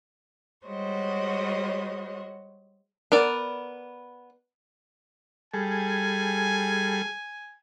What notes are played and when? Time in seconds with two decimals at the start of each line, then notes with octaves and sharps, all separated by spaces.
0.66 G3 G#3 F#4 C5 C#5 D#5
3.12 B3 A#4 D5
5.54 G3 G#4 A4 G#5